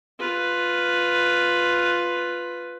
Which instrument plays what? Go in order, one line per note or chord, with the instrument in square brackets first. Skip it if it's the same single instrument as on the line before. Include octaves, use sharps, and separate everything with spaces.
[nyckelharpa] F4 B4